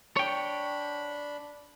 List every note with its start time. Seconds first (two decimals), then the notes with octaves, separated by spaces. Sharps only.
0.17 D4 C#5 G5 B5